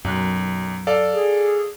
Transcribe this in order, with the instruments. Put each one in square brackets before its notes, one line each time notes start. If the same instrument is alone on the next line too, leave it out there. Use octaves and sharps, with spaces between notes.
[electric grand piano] B1 F#6 [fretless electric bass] F#2
[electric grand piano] A4 D5 F5
[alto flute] G#4